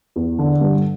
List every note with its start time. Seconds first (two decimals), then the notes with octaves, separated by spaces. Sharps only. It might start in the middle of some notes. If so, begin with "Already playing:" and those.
0.16 E2
0.39 D3
0.61 G2